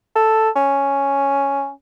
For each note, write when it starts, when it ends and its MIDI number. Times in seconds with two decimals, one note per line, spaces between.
0.15 0.50 69
0.56 1.71 61